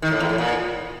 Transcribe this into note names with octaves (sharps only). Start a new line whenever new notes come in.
D#3
A2
E2
A2
A#2